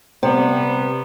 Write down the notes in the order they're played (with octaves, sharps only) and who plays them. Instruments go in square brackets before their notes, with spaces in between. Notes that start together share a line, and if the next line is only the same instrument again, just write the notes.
[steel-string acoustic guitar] C3 [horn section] G3 B3